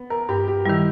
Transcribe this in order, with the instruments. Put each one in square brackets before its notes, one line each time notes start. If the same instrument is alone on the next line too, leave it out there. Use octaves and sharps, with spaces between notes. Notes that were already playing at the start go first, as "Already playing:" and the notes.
Already playing: [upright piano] B3
A#4
[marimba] G2 [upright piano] G4
[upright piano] G4
[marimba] D#3 G3 [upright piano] E4